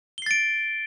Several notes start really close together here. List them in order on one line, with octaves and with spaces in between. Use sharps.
G7 C7 A6 D7